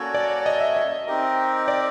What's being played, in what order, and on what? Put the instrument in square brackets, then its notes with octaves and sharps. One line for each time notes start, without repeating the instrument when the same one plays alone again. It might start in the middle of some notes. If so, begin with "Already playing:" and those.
Already playing: [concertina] A#3 C#4 F#4 A4 C#5 [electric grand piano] D5
[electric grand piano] D5
D#5
E5
D#5
[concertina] C4 D#4 G4 A#4
[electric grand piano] D5